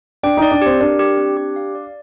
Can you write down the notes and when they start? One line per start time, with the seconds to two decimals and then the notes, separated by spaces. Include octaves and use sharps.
0.23 D4 G5
0.37 D#4
0.42 D5
0.51 D4
0.62 C4 G4
0.80 D4 A#4
0.99 G4
1.17 C4
1.37 G4
1.56 F5
1.75 D5